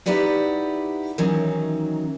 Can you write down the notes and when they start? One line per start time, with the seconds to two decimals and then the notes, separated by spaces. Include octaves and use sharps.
0.06 D#4 E4 G4 B4 D5 F#5
1.18 D#3 E3 F#3 C#4 D#4